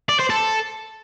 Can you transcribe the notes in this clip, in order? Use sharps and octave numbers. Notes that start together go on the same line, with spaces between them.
D5
C5
A4